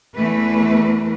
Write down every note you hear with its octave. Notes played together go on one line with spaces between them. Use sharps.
E2 E3 A3 B4